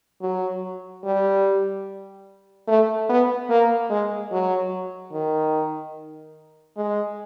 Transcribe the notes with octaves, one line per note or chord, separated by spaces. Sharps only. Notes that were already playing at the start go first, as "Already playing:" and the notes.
F#3
G3
A3
B3
A#3
G#3
F#3
D#3
G#3